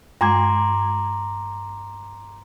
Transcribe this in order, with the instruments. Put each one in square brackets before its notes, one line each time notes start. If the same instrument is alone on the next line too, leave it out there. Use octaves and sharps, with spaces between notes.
[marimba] G2 G#3 [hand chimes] A#5 C6 D6